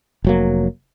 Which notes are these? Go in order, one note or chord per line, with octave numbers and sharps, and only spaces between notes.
F1 F#3 A#3